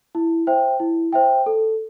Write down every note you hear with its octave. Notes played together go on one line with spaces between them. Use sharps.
E4
C5 E5 G5
E4
C5 E5 G5
A4